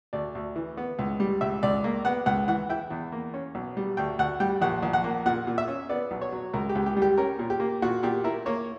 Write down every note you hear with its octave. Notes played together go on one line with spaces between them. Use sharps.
D2 D5
D2
E3
B3
C#2
G3
C#2 E5
C#2 D5
A#3
B3 F#5
C#2 F#5
E3 F#5
E4 G5
E2
A#3
C#4
B1
G3
D2 G5
D2 F#5
G3 G5
A#1 F#5
A#1
F#5
A#3
A#2 F#5
A#2
E5
C#4
B3 D5
B1
C#5
F#3
C#2 A#4
G4
C#2
G4
G3
G4
C#4 A#4
A#2
G4
A#3
A#2 F#4
A#2 G4
E4 A#4
A#3 C#5